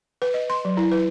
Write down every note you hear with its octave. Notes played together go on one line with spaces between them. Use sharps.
B4
D#5
C6
F#3
E4
B4